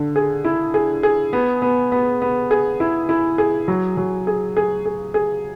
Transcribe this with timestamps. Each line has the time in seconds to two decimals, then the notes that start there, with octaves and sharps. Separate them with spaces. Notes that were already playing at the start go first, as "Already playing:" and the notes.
Already playing: D3
0.16 G#4
0.44 E4
0.74 G#4
1.03 G#4
1.33 B3
1.62 B3
1.92 B3
2.22 B3
2.51 G#4
2.80 E4
3.09 E4
3.38 G#4
3.68 F#3
3.97 F#3
4.27 G#4
4.57 G#4
4.86 G#4
5.14 G#4